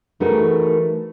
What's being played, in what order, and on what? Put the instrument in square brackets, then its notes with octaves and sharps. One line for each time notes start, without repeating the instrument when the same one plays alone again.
[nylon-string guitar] E3 A3 D#4 F#4 G#4 A#4